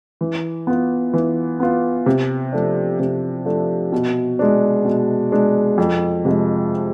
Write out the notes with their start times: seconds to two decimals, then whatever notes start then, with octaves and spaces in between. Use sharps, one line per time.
0.21 E3
0.67 B3 F4
1.13 E3
1.60 B3 F4
2.06 C3
2.52 F3 A3 D4
2.99 C3
3.45 F3 A3 D4
3.92 B2
4.39 G#3 D4
4.85 B2
5.32 G#3 D4
5.78 F2
6.25 C3 F3 G#3